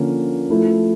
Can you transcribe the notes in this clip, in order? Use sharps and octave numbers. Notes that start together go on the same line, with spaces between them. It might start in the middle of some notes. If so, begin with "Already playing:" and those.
Already playing: D3 F3 A#3 C#4
F3 A3 E4